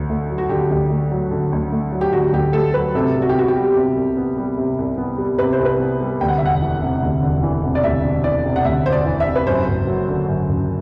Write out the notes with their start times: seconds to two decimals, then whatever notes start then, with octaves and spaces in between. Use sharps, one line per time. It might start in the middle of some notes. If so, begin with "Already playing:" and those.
Already playing: D2 D3
0.10 A3
0.30 F#3
0.38 F#4
0.49 D3 G4
0.71 D2
0.90 A3
1.11 F#3
1.31 D3
1.52 D2
1.72 A3
1.92 F#3
2.01 G4
2.12 D3 F#4
2.33 D2 G4
2.53 A3 A4
2.74 F#3 B4
2.95 C3 A4
3.15 C2
3.22 F#4
3.29 G4
3.35 B3 F#4
3.48 G4
3.56 G3
3.76 C3
3.96 C2
4.17 B3
4.37 G3
4.58 C3
4.79 C2
4.98 B3
5.18 G3
5.39 C3 B4
5.53 C5
5.59 C2
5.65 B4
5.80 B3
6.01 G3
6.21 D2 G5
6.28 F#5
6.38 E5
6.42 E1 F#5
6.61 E3
6.82 C3
7.03 D2
7.22 E1
7.43 E3
7.64 C3
7.75 D5
7.84 D2 E5
8.04 E1
8.24 E3 D5
8.46 C3
8.56 F#5
8.65 D2 E5
8.86 E1 C5
8.92 D5
9.06 E3
9.20 E5
9.26 C3
9.35 B4
9.46 F#2 C5
9.68 F#1
9.87 F#3
10.08 D3
10.28 F#2
10.49 F#1